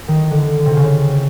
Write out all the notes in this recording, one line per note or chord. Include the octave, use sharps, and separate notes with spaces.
D#3
D3
C3
C#3